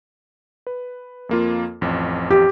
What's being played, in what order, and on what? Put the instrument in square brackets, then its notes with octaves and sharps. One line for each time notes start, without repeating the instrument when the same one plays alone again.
[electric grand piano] B4
F2 A#3 F4
A1 F2
[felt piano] G4